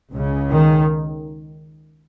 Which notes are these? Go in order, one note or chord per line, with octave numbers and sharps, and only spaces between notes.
C#2 C#3
D#3